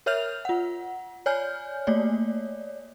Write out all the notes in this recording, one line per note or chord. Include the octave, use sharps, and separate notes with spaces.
A#4 C#5 E5 F6 G6 F7
F4 F#5
C#5 D5 G#5 F6 G6
A3 A#3 C#5 D5